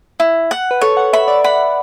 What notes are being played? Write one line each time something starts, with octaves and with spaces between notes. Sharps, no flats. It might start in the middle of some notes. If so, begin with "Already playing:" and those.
E4
F#5
B4
A4 C#5
F#5
E5 B5
D5
F#5 B5